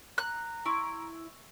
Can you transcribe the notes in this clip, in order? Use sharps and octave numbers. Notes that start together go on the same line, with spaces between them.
A#5 F#6
E4 C6 C#6